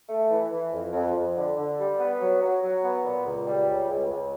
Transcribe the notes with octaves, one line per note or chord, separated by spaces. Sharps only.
A3
E3
E3
F2
F2
F2
D3
D3
G3
B3
F#3
F#3
F#3
B3
A#2
C#2
G3
C#2
C#2
C#2